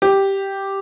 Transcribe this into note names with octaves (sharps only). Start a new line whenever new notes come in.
G4